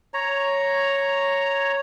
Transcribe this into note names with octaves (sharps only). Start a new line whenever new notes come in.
C#5 A#5